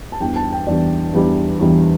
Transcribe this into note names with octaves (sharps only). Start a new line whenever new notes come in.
A5
E2 E3 G3 D4 G5
A5
G5
E2 E3 G3 D4 D5
E2 E3 G3 D4
E2 E3 G3 D4